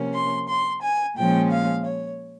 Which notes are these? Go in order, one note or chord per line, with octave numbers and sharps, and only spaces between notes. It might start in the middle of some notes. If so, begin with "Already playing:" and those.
Already playing: C3 F3 A#3 C#4
C6
C6
G#5
A#2 F3 G#3 C#4 G5
F5
C#5